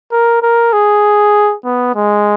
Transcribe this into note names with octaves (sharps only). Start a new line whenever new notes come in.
A#4
A#4
G#4
B3
G#3